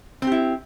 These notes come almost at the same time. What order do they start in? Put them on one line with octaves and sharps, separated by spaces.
C4 G4 E4